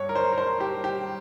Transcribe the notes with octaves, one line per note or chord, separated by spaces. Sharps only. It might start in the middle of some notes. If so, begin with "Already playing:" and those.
Already playing: G2 C#5
A#4
C5
A#4
C5
G4
G4